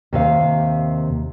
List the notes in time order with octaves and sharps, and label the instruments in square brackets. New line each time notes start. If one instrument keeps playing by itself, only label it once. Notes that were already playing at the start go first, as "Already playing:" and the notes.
[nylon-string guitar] D#2 C3 F5